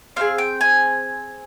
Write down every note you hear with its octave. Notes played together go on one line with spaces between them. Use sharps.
C4 F4 G#4 F5
G5
G#5